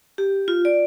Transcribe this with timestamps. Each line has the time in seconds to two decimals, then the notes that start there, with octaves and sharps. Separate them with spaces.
0.18 G4
0.48 F4
0.65 D5